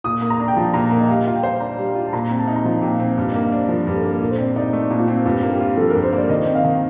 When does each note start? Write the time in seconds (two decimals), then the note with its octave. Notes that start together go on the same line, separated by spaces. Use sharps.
0.04 A#2 D#6
0.22 A#3
0.30 A#5
0.40 D4
0.48 G5
0.57 F3 A5
0.74 A#2 A#5
0.91 A#3
1.00 D#5
1.08 G3 F5
1.26 F4 F5
1.35 G5
1.43 C5
1.60 D4 A#5
1.78 G3
1.95 F4
2.06 A5
2.13 A#2 A#5
2.31 C4
2.39 A5
2.48 D#4
2.56 A#5
2.65 F3 A5
2.82 A#2 G5
2.91 F5
3.00 C4
3.16 G2 F5
3.30 A#3 D#5
3.43 F5
3.52 D4 C5
3.69 F3 A#4
3.86 G2 G4
3.95 A4
4.03 A#3
4.16 A4
4.22 A#2 A#4
4.31 C5
4.38 C4 D5
4.56 D#4 D5
4.73 A3 C5
4.90 A#2
4.99 F4
5.08 C4
5.25 G2 F4
5.43 A#3
5.51 G4
5.61 F4
5.77 F3 A4
5.90 G2 A#4
6.03 C5
6.12 A#3 D5
6.29 D#3 D#5
6.47 C4
6.55 F5
6.64 D#3